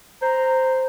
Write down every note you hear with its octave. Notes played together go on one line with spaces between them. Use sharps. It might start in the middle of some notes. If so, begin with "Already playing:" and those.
C5 A#5